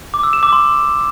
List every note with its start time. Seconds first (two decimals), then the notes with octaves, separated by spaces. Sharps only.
0.14 D6
0.23 E6
0.33 E7
0.43 D6
0.53 C6